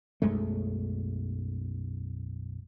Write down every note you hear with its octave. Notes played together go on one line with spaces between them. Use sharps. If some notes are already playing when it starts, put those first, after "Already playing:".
B1 F#2 G#3 A3